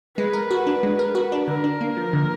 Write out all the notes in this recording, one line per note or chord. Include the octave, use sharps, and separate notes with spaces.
G#3 B4
A#4
F#4
D4
G#3
A#4
F#4
D4
D3 A#4
D4
A#3
F3
D3